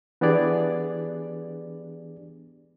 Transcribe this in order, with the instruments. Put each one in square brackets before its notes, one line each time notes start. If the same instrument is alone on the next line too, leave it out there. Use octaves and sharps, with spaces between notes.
[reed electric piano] E3 B3 D4 G4 G#4 D5